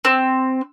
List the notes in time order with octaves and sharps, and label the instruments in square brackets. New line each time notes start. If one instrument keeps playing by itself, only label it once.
[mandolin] C4